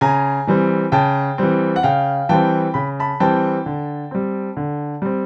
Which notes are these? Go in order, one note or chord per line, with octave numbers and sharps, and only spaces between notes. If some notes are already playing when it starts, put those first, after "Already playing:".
C#3 G#5 A#5
E3 G3 C4
C#3 G5 A5
E3 G3 C4
F#5
C#3 F5 G5
E3 G3 C4 G5 A5
C#3 B5
A5 B5
E3 G3 C4 G5 A5
D3
G3 C4
D3
G3 C4